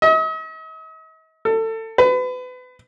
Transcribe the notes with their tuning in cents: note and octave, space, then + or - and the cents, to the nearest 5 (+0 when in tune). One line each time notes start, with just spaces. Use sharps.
D#5 +45
A4 +25
B4 +30